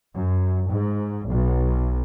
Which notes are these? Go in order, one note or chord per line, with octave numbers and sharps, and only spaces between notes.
F#2
G#2
B1